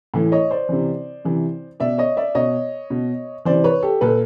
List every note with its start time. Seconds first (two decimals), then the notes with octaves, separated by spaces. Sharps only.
0.14 A2 E3
0.32 C#5 D#5
0.51 C5 D5
0.69 C3 E3
1.25 C3 E3
1.80 B2 D5 E5
1.98 C#5 D#5
2.17 D5 E5
2.35 B2 C#5 D#5
2.90 B2
3.45 C3 E3 C5 D5
3.64 B4 C#5
3.83 G4 A4
4.01 A#2 A4 B4